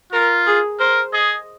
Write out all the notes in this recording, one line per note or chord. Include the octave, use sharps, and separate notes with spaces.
F4 A#4
G#4
A#4 C5
G#4 D#5